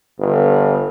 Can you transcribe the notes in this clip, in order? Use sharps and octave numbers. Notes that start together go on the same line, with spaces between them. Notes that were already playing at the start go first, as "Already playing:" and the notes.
G1